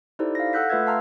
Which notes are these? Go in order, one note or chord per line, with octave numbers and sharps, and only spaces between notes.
D#4 E4 G4 A4 C5 D5
F5 A#6
A4 F#5 E6 F#6 G6 B6
A3 F4 B4 E5 E6 G#6
F5 A5 A#5 C6 E6 F6